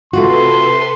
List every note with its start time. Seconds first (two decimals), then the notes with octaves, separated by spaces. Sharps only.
0.13 C3 A3 F4 F#4 A4 B4 C6